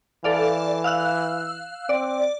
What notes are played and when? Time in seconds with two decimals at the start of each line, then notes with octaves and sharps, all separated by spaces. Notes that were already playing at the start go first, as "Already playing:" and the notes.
0.24 E3 A4 D5 F5
0.84 F5 E6 F#6
1.89 C4 D5